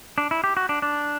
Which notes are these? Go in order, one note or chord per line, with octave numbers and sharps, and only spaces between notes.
D4
E4
G4
F#4
D4
D4